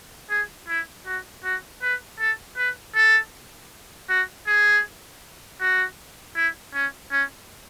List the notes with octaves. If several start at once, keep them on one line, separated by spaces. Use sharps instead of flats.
G#4
E4
F#4
F#4
B4
A4
B4
A4
F#4
G#4
F#4
E4
C#4
C#4